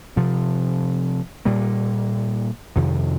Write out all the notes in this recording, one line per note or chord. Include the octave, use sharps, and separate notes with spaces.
C3 F3 C4
A#2 G3 A#3
F2 C3 D#3